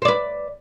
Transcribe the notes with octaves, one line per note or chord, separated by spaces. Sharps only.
B4 C5 D5